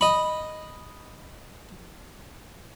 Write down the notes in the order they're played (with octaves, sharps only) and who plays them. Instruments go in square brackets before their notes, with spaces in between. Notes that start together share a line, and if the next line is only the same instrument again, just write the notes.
[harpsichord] D#5 B5